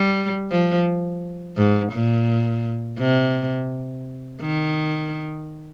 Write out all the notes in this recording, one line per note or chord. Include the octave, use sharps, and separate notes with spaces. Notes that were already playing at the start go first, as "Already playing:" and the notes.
Already playing: G3
F3
G#2
A#2
C3
D#3